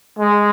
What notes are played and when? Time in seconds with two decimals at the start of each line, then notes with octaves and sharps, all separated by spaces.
0.19 G#3